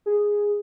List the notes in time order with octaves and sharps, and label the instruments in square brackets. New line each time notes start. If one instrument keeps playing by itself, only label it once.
[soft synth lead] G#4